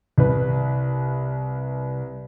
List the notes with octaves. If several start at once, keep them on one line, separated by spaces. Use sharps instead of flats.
C2 B4